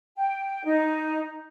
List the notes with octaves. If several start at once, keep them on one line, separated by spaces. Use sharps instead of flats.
G5
D#4